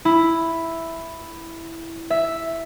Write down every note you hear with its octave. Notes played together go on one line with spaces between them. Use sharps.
E4
E5